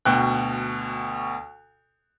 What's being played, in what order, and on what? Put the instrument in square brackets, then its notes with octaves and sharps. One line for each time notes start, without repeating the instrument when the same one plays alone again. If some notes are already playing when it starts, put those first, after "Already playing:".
[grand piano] D2 B2 G5 F#6